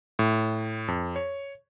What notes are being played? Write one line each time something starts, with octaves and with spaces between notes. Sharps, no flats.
A2
F2
C#5